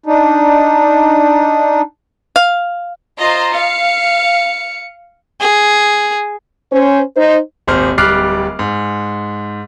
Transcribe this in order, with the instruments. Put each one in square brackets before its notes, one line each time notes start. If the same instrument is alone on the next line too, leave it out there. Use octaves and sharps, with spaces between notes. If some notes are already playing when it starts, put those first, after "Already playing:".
[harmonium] D4 D#4
[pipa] F5
[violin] F4 C5 [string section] D#5 A#5
[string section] F5 [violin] C#7
[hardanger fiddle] G#4
[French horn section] C#4 C5
D#4 C5
[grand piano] D#1 G#1 C5 F6
D1 G3 D6 F6 F#6 C7
G#2